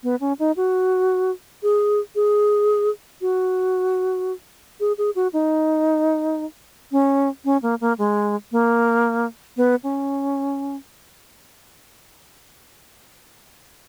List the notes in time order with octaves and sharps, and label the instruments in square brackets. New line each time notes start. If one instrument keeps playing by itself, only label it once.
[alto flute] B3
C#4
D#4
F#4
G#4
G#4
F#4
G#4
G#4
F#4
D#4
C#4
C#4
A#3
A#3
G#3
A#3
B3
C#4